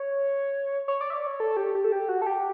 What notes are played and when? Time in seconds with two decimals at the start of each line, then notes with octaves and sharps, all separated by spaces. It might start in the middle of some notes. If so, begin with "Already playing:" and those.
Already playing: C#5
0.88 C#5
1.01 D5
1.10 E5
1.13 D5
1.27 C#5
1.40 A4
1.57 G4
1.75 G4
1.84 A4
1.92 G4
2.09 F#4
2.22 A4
2.26 G4